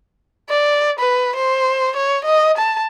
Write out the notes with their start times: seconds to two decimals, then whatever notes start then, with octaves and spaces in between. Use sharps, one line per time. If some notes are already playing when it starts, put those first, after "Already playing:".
0.49 D5
0.99 B4
1.36 C5
1.96 C#5
2.24 D#5
2.57 A5